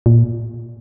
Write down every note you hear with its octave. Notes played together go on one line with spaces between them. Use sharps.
A#2